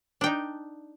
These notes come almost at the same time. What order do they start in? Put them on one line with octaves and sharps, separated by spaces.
D4 G5 D#4